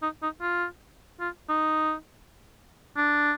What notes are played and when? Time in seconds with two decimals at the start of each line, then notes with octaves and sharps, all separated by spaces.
0.02 D#4
0.23 D#4
0.41 F4
1.20 F4
1.49 D#4
2.97 D4